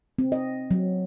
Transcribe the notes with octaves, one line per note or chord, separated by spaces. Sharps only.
C4
D#5
F#3